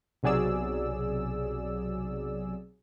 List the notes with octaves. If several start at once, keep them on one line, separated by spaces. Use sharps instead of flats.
B1 C3 F#3 G#4 D5 E6